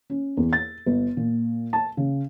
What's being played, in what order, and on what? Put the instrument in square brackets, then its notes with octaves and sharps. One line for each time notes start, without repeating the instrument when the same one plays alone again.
[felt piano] C#4
E2
A6
G1
A#2
A5
C#3